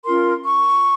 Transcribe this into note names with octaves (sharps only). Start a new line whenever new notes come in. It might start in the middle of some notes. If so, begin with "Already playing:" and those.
C#4 F4 A#4 C6
C#6